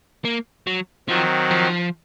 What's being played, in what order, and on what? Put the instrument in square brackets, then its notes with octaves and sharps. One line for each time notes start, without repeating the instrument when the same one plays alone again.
[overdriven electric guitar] A#3
F#3
[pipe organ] D#3 F#3 C4 [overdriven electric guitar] F3
[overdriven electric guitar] F3